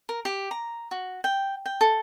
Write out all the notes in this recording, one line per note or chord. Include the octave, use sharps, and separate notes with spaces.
A#4
G4
A#5
F#4
G5
G5
A4